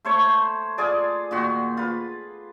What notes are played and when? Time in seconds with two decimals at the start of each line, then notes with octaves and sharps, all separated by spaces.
0.05 A3 C5 C#5
0.78 F4 G#4 D5
1.31 A#2 D#3 F#4
1.77 F4 B4